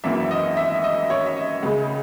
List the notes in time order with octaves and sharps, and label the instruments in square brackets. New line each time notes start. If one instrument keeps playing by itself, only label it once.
[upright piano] G#1 F#2 E3 A#3 E5
D#5
E5
D#5
C#5
E5
D#5
C#2 C#3 G#3